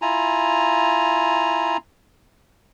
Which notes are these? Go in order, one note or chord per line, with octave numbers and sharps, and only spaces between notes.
E4 F4 G#5 A#5